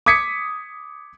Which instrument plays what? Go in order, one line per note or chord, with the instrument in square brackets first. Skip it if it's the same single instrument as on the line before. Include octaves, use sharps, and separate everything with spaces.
[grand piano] D6 D#6 G#6 B6 C#7